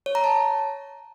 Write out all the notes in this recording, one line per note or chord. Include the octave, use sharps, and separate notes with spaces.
C#5
A#5
A5